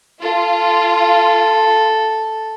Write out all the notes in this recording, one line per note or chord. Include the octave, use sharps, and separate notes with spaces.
F4 A4